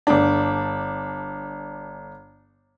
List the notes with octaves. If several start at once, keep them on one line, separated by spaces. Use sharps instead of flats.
G1 D4